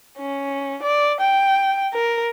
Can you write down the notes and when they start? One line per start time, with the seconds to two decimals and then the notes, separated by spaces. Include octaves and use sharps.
0.18 C#4
0.83 D5
1.20 G5
1.93 A#4